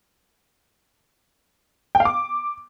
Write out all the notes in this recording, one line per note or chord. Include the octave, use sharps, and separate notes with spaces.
G5
F5
D6